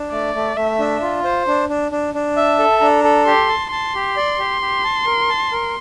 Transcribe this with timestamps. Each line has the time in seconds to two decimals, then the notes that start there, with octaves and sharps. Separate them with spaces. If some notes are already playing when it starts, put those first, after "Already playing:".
Already playing: D4
0.12 A3 D5
0.34 A3
0.57 A3 E5
0.79 D4
1.02 F4
1.24 C5
1.47 D4
1.69 D4
1.92 D4
2.14 D4
2.36 E5 A5
2.59 A4
2.81 D4 A#5
3.04 A4
3.27 G4 C6
3.49 A5
3.71 A5 C6
3.95 G4
4.17 D5
4.39 G4
4.61 G4
4.84 A5
5.06 A#4
5.29 A5
5.52 A#4